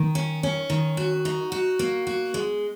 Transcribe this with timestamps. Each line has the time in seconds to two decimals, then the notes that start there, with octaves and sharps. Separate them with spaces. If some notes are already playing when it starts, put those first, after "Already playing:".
Already playing: D#3
0.15 C#4
0.43 C#4
0.70 D#3
0.97 F#4
1.25 D#4
1.52 F#4
1.79 A#3
2.07 F#4
2.34 G#3